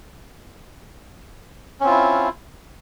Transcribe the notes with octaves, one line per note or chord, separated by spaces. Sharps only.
C4 C#4 E4 F4